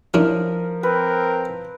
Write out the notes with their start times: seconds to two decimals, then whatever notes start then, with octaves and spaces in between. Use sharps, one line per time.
0.14 F3 C#4 D4 E4 A#4
0.83 C4 A#4 B4